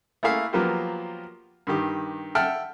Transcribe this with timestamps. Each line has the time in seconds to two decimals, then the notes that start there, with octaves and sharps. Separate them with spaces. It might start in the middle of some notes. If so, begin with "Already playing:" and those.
0.23 A3 A#3 E4 G#4 E5 F5
0.53 F3 F#3 A#3 B3 F4 G4
1.67 G2 D#3 G4
2.35 E5 F#5 G5 A5 F6